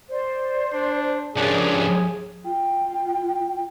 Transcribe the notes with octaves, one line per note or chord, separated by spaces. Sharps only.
C5 D5
D4
C#2 F3 D4 G4 G#4 A#4 C#5
F4 G5